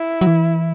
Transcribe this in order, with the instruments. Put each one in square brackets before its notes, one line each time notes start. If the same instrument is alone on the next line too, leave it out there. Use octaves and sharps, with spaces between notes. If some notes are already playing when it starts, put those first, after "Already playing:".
Already playing: [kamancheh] E4
[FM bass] F#3
E3